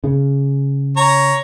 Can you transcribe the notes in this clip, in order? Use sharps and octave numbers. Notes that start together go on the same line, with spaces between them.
C#3
C#5 A#5